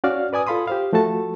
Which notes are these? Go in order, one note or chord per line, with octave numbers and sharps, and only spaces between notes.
C#4 F#4 D5 F5 F6
B4 D5 G#5 D#6
F4 A4 F5 B5 C6 D#6
G4 C5 F5
F3 A3 F#4 A4 A5